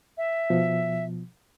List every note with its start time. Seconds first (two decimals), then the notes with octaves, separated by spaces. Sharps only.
0.18 E5
0.50 B2 F3